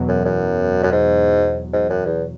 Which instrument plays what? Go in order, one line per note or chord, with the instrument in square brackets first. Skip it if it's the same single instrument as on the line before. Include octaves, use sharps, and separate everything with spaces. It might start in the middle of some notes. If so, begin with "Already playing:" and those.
Already playing: [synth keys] E2 B2 F#3
[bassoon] F#2
F#2
F#2
G#2
G#2
F#2
E2